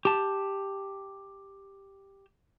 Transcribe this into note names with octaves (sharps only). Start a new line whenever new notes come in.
G4 A5